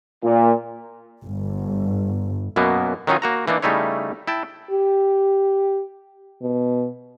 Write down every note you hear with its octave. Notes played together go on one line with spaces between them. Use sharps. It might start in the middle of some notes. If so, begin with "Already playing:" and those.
A#2
G1
F#2 B2 F#3 A#3 B3
D#3 F#3 C#4 D#4 F4
A#3 F#4 A#5
E3 A#3 D4 D#4
C#3 G3 A3 D#4 E4 C#5
E4 G5 A5
G4
B2